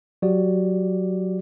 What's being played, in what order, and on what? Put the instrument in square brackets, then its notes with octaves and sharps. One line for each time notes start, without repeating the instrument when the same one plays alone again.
[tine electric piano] F#3 F#4 G4 D5